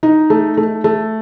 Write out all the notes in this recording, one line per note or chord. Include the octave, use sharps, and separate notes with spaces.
D#4
A3
A3
A3